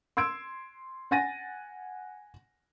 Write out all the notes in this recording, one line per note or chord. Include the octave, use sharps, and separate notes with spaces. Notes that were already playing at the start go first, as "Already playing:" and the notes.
C6 E6 G#6 D7
F#5 G#5 A6 A#6 D#7